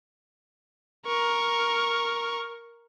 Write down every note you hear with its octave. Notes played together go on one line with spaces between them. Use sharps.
A#4 C#6